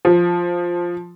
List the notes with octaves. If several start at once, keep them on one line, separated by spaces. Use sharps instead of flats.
F3